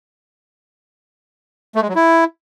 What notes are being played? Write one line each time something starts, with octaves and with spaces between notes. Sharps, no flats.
A3
G#3
F#3
E4